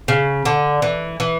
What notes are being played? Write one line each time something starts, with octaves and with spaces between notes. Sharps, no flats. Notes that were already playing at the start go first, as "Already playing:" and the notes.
C#3
D3
E3
E3